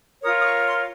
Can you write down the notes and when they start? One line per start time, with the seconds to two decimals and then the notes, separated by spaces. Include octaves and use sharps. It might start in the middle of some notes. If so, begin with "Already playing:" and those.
0.22 F4 A#4 C#5 D#6
0.39 D#6
0.44 C#6
0.66 C6